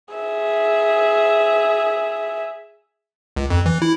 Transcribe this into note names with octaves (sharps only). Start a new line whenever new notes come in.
G#4 E5
C#2
F2
E3
E4